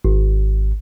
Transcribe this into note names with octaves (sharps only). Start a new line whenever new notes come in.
G#1